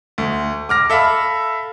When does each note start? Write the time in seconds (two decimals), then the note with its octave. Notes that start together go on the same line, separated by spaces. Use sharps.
0.18 D2
0.69 D6 F6 A#6
0.90 A4 E5 F5 B5